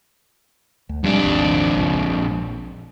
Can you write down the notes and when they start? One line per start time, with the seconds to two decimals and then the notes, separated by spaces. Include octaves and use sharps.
0.89 D2
1.04 F2 G3 D4
1.23 G#1 D#2
1.75 G1 C#2
1.95 A#1